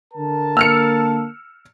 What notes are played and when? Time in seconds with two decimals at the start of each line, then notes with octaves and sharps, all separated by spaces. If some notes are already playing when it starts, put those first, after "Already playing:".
0.13 D3 A#4 A5
0.57 A#3 E6 F6 C#7